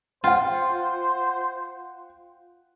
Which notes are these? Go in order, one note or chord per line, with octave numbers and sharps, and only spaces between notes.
F4 C5 F#5 G5